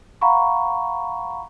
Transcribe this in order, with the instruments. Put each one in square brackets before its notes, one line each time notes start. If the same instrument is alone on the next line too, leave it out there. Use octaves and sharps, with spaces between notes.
[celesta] F5 F#5 A#5 B5 C#6